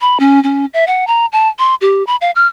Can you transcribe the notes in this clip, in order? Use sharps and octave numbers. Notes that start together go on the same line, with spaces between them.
B5
C#4
C#4
E5
F#5
A#5
A5
C6
G4
B5
F5
F6